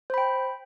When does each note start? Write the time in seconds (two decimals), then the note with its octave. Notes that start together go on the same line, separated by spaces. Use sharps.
0.10 C5
0.14 B5
0.18 G5